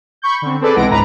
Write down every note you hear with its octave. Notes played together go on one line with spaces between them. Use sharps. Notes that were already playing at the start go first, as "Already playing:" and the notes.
B5 C#6 G6
D3 C4
C4 G#4 A4 B4 D5
B1 E3 G#3 F#5 A#6 D7
G1 C#2 G#2 B4 A#5